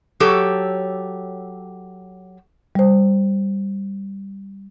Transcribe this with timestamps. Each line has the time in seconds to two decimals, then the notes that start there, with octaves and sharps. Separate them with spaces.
0.20 F#3 G4 A4 C#5
2.75 G3 C5